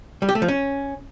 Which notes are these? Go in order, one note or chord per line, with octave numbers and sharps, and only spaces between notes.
G3
G4
A3
F3
C#4